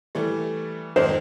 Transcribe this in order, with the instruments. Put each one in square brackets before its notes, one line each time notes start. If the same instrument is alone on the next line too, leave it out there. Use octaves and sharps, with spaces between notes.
[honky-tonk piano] E3 G3 A3
[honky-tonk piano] F2 G#2 D#3 [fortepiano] C5